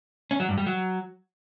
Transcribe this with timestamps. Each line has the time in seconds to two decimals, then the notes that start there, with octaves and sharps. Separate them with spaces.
0.31 C#4
0.40 F#3
0.49 G2
0.58 G3
0.67 F#3